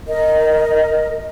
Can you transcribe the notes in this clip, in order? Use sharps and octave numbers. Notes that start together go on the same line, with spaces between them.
A#4 D#5